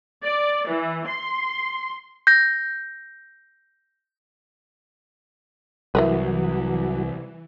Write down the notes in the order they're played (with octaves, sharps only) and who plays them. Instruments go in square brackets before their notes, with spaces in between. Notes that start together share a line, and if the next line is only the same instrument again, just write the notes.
[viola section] D5
E3
C6
[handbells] G6 A#6
[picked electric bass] C2 [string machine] E3 [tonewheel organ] F#3 F#4 [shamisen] E4 A#4 B4